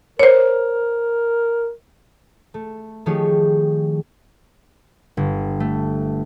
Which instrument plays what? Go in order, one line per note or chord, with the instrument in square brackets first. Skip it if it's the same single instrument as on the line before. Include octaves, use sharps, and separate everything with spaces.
[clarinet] A#4 [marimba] C5 C#5
[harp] A3
D#3 F3 A3 G4 G#4 C#5
G1
A3